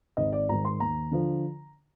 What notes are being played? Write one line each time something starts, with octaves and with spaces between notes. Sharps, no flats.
G#1 D#5
D5
G#2 D#3 A#5
C6
D#2 A#5
D3 F3